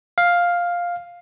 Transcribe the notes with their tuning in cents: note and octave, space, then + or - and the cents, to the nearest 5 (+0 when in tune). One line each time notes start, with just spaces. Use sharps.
F5 +5